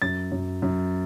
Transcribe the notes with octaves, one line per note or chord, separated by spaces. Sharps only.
F#2 A6
F#2
F#2